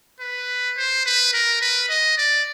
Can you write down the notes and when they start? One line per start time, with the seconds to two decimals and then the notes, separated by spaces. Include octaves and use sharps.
0.20 B4
0.77 C5
1.06 B4
1.33 A#4
1.61 B4
1.89 D#5
2.18 D5